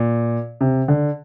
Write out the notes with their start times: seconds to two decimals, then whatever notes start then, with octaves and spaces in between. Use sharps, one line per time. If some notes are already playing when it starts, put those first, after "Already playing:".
Already playing: A#2
0.61 C3
0.88 D3